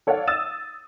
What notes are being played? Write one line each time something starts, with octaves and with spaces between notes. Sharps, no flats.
A4 C#5 D5 F5 F#5
D#6 E6 A6 E7